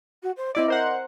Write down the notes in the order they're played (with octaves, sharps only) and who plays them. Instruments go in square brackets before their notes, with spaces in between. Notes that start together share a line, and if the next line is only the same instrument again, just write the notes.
[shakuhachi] F#4
C5
[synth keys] C4 E4 D5 [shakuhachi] D#5
[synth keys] A#4 C5 F#5